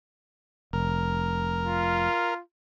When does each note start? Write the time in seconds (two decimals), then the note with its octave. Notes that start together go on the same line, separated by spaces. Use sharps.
0.73 F1 A#4
1.64 F4